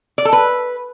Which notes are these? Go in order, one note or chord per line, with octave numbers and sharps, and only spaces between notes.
D5
A4
B4